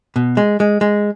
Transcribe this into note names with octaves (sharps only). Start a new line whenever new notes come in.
B2
G#3
G#3
G#3